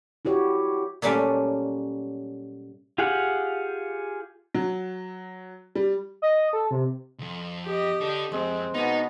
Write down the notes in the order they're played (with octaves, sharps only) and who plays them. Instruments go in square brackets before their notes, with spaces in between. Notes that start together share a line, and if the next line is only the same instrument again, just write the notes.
[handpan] E4 F#4 G4 C#5
[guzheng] A#2 F#3 G3 A3 C#4
[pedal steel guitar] F4 G4 G#4 F5 F#5
[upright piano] F#3
G3
[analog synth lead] D#5
A4
C3
[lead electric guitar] C2 F2
[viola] G4 D#5
[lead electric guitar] D4 A4
[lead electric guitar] F2 [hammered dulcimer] G#3 [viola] C4
[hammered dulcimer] B2 A#5 [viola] B3 [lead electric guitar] D#4